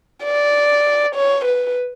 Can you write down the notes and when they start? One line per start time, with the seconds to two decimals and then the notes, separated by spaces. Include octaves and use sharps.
0.25 D5
1.15 C#5
1.45 B4